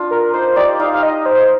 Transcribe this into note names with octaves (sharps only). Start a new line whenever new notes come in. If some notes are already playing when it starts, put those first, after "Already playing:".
Already playing: D4 F4
A#4
D#4 C5
D#4 G4 D5
D#4 G4 F5
F5
D#5
C5